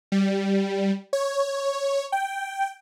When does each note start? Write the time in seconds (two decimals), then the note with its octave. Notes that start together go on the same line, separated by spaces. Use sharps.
0.12 G3
1.13 C#5
2.12 G5